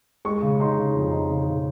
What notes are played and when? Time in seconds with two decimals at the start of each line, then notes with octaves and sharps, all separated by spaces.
0.25 G#3 C#6
0.42 C#3
0.60 D#4 C6
0.78 C#3
0.95 F2
1.11 D#4
1.30 C#3
1.46 C#3